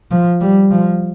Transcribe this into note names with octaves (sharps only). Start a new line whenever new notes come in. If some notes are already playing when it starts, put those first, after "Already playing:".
F3
G3
F3